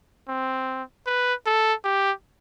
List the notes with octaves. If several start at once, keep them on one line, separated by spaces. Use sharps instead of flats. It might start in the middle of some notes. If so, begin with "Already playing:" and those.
C4
B4
A4
G4